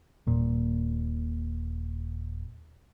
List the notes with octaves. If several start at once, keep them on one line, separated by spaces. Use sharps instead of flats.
D#1 A#2